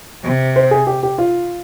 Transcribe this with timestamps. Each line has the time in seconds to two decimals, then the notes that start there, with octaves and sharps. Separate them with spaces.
0.24 C3
0.56 C5
0.71 G#4
0.87 G4
1.03 G4
1.18 F4